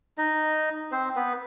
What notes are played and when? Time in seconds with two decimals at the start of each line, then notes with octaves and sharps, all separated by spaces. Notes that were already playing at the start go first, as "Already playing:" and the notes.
0.18 D#4 D#5
0.92 C4 C5
1.16 B3 B4